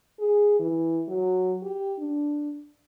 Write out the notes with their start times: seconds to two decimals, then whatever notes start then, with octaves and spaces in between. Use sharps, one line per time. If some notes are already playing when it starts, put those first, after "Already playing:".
0.19 G#4
0.60 E3
1.08 F#3
1.62 G4
1.99 D4